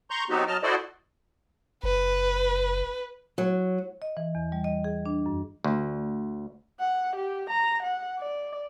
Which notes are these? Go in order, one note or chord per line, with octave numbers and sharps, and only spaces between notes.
A#5 C6 C#6 G6
F#3 B3 C4 D#4 F#4 G4
F#3 D#5 A5 F6
E4 F#4 A4 C5 D5 D#5
F#1 B4
F#3
D#5
E3
E2
G3
D#5
G#4
D4
F#2
D2
F#5
G4
A#5
F#5
D5